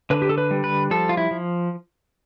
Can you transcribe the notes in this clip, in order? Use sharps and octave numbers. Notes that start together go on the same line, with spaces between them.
D3 B4
G4
A4
B4
G3
B4
F3 A4
F4
E4
F3